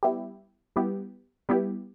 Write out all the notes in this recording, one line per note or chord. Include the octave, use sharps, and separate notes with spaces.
G3 B3 E4 G4
G3 B3 E4 G4
G3 B3 E4 G4